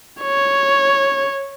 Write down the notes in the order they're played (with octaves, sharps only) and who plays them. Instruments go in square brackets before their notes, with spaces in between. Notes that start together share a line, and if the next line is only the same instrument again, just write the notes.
[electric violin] C#5